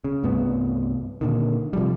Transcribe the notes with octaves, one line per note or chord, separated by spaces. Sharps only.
C#3
C2 G2 A3 B3
A#2 D3 D#3
C3 F3 G3